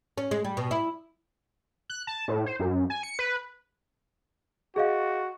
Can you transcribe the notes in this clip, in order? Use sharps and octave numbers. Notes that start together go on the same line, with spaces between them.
C#4
G#3
G3
B2
E4
F#6
A5
A2
C5
F#2
G#5
C#7
B4
F#4 G#4 D#5 F5